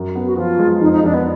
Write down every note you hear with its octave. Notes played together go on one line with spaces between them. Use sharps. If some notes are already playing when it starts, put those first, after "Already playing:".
Already playing: F#2
B3
F#4
F3 F4
G#3
F2 D#4
D#4
F2 D4
B3